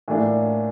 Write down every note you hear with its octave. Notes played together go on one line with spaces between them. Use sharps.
A2 E3 A#3 D4 F4